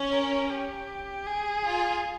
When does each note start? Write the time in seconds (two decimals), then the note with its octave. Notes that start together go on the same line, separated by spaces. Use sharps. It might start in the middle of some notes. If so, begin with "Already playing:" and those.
Already playing: C#4
0.11 A#4
0.50 G4
1.27 G#4
1.66 F4